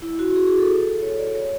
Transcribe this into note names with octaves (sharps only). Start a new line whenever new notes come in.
E4
F#4
G#4
G#4
A4
C#5
D5
C#5